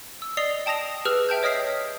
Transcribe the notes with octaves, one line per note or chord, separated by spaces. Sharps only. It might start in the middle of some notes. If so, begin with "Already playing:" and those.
E6
D5 D#5 D#6 C7 F7 G7
G5 A5 D#6 A#6 F7
G4 G#4 B4 E6 F6
E5 G5 A5 G6
C#5 D#5 D#6 F6 B6 C7